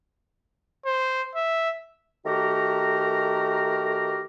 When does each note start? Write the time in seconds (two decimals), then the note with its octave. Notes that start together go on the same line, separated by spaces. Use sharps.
0.86 C5
1.35 E5
2.25 D#3 A3 F#4 G4 A#4 A#5